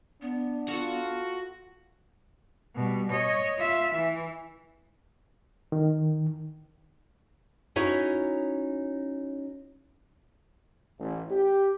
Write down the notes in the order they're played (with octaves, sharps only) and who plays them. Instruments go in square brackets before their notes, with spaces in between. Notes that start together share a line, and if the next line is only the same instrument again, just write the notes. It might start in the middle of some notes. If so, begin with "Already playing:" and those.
[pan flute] B3 [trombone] D4
[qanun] F4 A4 F5 [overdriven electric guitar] F#4
[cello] B2 G3
C#5 D#5
F4 E5
E3
[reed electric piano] D#3
[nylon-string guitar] C#4 D#4 E4 F#4 C#5
[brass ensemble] A1
G4